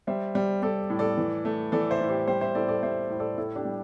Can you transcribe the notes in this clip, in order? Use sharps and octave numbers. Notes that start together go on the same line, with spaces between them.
G3 C5 E5
G3
G3 A4 D5
A2
A4 D5
E3
A3
E3 A4 D5
C5 E5
A2
G4 C5
G3 G4 C5
C5 E5
A2 A4 D5
A4 D5
G3 C5 E5
A2
A4 D5
A2 E4 A4
D4 G4
G3